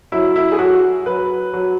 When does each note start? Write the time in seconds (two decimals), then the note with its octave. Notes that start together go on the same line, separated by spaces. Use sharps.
0.12 F#3 E4
0.36 E4
0.52 G#4
0.58 F#3 F#4
1.06 F#3 B4
1.54 F#3